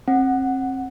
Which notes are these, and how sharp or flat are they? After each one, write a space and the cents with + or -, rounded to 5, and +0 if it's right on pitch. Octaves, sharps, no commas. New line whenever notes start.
C4 +35 F#5 +5